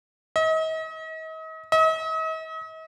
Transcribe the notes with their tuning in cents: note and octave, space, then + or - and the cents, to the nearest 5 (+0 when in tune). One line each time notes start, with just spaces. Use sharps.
D#5 +40
D#5 +45